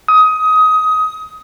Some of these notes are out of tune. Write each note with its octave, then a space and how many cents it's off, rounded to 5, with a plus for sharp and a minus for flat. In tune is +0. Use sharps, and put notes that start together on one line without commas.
D#6 +20